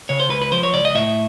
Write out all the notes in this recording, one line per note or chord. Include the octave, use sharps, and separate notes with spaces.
C#3 C#5
C5
C#2 B4
B4
F3 C5
C#5
C#2 D5
D#5
A2 E5